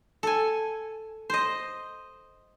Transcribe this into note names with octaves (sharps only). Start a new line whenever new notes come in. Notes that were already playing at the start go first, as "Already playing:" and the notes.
A4 G#5
C5 D#5